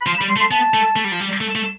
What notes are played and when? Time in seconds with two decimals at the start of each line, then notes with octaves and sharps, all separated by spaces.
0.01 B5
0.06 F3 C6
0.18 B5
0.21 G3
0.29 C6
0.36 A3
0.40 C6
0.51 B3 A5
0.74 A3
0.96 A3
1.04 G3
1.12 F3
1.20 G3
1.41 A3
1.56 A3